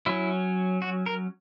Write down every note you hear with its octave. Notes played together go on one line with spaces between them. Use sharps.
F#3 C#4 E4
F#4
A#4